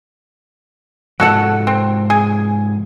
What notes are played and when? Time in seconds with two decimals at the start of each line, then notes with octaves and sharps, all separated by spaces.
1.20 G#2 C3 F3 F#4 A4 F#5
1.67 C4
2.10 G#4